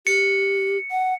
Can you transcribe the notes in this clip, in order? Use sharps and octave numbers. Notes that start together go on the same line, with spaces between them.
G4 C#7
F#5